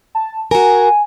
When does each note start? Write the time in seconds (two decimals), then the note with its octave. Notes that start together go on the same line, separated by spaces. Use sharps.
0.15 A5
0.51 F#4 A#4 G#5